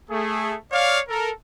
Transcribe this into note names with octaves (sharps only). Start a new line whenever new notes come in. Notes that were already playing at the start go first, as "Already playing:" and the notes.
A3 G#4
C#5 D5 F5
A4 A#4